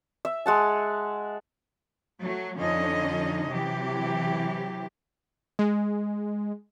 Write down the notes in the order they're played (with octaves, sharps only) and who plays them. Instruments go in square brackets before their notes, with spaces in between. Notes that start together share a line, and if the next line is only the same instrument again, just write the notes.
[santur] E5
G#3 F#5 A5
[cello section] F#3 A3
F2 D3 F3 C#4 D#4 D#5
C3 E3 F#3 G4
[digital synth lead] G#3